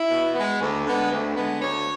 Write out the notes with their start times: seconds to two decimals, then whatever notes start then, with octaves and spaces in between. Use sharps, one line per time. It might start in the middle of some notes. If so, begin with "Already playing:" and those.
Already playing: E4
0.10 B2
0.35 G#3 B3
0.61 D2
0.87 D3 G#3 B3
1.12 D2
1.37 D3 G#3 B3
1.62 D2 C#5